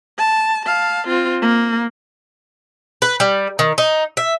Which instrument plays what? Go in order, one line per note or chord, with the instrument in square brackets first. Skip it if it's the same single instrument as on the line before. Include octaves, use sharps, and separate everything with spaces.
[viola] A5
F5 A5
C4 F4
A#3
[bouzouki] B4
G3
D#3
D#4
E5